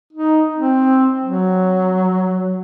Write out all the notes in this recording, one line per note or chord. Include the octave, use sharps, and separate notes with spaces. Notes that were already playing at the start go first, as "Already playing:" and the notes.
D#4
C4
F#3